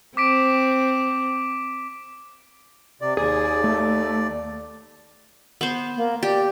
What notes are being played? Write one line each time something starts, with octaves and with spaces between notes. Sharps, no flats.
C4 D6 B6 D7
C3 D5
D#2 G#4 D5
A3
B3 C5
A#3
G4 D5